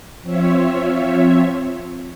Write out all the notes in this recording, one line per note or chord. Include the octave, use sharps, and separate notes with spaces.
F3 C4 F4 C#5 E5